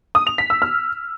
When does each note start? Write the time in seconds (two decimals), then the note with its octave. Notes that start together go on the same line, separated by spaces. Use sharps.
0.15 D#6
0.27 F7
0.38 B6
0.50 E6
0.62 F6